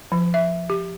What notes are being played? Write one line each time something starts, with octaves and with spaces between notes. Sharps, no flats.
F3
E5
G4